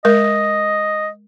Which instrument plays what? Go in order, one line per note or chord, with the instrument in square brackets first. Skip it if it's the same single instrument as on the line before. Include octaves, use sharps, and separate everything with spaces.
[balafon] G#3 A#4 [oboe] D#5